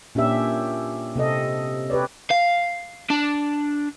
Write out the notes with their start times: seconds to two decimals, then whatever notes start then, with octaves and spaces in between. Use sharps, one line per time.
0.15 A#2 C#4 D4 G4 E5
1.16 C3 C4 A4 D#5
1.90 G4 B4 C#5 D5
2.31 F5
3.10 D4